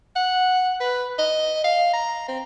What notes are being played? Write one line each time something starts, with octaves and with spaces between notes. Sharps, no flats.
F#5
B4
D#5
F5
A#5
C4